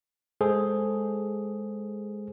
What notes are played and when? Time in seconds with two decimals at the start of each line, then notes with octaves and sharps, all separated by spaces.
0.41 G#3 G#4 A4 C5